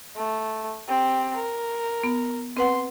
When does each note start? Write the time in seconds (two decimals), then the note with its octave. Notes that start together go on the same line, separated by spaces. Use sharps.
0.16 A3
0.88 C4 G4
1.36 A#4
2.03 B3
2.57 C4 B4 F#5 C6